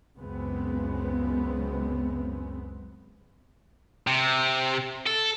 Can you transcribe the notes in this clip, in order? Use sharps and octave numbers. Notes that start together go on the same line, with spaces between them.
C#2 F#2 C#3 G#3 B3 C4
C3
A4